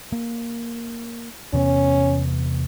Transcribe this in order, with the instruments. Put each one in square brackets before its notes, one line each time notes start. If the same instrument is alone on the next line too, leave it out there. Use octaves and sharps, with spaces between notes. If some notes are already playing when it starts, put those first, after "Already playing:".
[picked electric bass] A#3
[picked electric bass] E2 C3 B3 [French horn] C#4